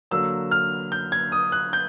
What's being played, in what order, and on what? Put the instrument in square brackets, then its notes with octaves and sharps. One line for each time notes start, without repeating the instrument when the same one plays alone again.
[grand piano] D3 F#3 A#3 E6
F6
G6
G#6
D#6
F#6
G6